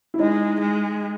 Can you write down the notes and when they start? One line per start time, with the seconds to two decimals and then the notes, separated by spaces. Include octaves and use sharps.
0.14 E4
0.19 G#3 D#4
0.61 G#3